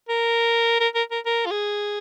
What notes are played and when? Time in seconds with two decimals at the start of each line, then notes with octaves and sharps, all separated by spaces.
0.09 A#4
0.80 A#4
0.95 A#4
1.11 A#4
1.26 A#4
1.46 F4
1.51 G#4